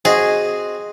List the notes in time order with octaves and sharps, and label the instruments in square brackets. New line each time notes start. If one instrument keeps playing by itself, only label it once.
[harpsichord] C4 F#4 D#5 [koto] G#4